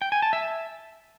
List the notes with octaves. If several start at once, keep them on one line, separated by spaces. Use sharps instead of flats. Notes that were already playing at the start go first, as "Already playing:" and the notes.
G5
G#5
A5
E5